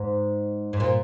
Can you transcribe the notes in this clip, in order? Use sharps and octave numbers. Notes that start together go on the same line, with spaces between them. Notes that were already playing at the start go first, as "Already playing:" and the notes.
Already playing: G#2
G#2
A#2